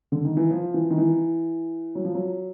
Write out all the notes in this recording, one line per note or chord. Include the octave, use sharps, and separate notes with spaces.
D3
D#3
E3
F3
E3
D#3
E3
F#3
F3
F#3